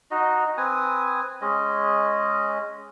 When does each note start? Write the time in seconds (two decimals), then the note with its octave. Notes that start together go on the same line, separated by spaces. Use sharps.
0.11 D#4 F#4 D#5
0.57 C4 B4 G#5 D#6
1.41 G#3 C#4 D#5